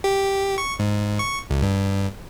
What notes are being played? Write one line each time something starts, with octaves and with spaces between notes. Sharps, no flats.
G4
C#6
G#2
C#6
C#2
G2